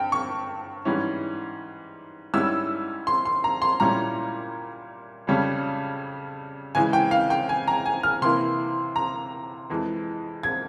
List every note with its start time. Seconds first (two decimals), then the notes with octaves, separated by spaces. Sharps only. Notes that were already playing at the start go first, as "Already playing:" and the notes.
Already playing: G2 G5
0.12 C#6
0.85 G#2 E3 G3 C#4 E4
2.34 G#2 G3 C#4 E4 E6
3.07 C6
3.25 C6
3.44 A#5
3.62 C6
3.80 A#2 G3 C#4 E4 A#5
5.27 F2 C#3 G3 C#4
6.75 C#3 E3 G#3 G#5
6.93 G5
7.11 F5
7.30 G5
7.49 G#5
7.68 A#5
7.86 G#5
8.03 F6
8.22 C3 E3 A#3 E4 C6
8.96 A#5
9.70 F2 E3 G#3
10.43 G#6